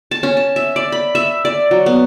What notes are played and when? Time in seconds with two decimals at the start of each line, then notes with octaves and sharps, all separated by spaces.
0.11 A5
0.23 C#4
0.37 A5
0.56 E5
0.76 D5
0.92 B5
1.15 E5
1.45 D5
1.71 F#3
1.86 B3